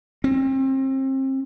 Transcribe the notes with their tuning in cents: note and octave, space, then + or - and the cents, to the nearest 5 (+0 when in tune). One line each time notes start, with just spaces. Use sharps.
C4 +35